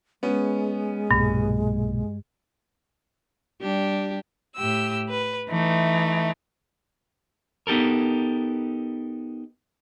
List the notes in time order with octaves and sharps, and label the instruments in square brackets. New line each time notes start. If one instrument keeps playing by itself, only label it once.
[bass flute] G#3 [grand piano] B3 C#4
[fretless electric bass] B1 A#2 [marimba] G2
[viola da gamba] G3 D4 G4
[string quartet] A2 G4 E6
B4
E3 A3 D#4
[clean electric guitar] B3 D#4 G4 A4 A#4